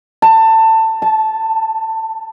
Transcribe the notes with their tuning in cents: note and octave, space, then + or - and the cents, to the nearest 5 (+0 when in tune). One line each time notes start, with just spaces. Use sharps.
A5 +20
A5 -10